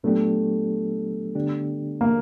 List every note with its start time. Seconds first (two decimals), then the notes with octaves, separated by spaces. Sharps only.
0.04 A#2 F#3 A3 B3 D4 G4
1.35 D3 G3 B3 D4 G4
2.01 A#3